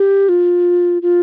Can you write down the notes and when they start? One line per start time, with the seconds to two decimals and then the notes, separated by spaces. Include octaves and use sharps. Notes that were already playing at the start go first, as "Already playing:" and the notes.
Already playing: G4
0.29 F4
1.02 F4